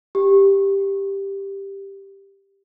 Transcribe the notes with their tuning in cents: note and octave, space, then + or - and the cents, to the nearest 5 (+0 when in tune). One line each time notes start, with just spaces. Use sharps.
G4 +5